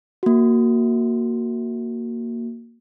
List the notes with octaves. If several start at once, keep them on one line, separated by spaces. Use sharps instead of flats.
A#3 F#4